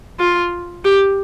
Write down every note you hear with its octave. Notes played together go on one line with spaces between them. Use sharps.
F4
G4